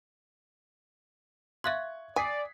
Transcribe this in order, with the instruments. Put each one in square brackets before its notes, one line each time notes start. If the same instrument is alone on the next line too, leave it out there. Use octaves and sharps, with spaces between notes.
[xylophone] E5 F5 C6 [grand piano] C#6 F#6 G#6
[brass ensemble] D5 [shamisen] G#5 [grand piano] D#6 B6 C7